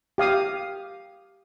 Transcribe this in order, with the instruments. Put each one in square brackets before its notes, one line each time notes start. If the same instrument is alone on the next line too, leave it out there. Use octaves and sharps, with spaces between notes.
[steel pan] G4 F5 D#6